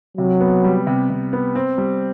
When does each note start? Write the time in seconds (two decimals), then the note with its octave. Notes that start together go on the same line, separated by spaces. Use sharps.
0.18 C3 F#3
0.41 B3
0.64 G3
0.87 C3
1.10 C3
1.33 B3
1.55 C4
1.78 G3